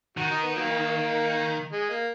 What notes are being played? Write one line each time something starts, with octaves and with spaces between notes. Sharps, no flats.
D#3 F#4
D#4
B3
F#3 A#3
G#3
A#3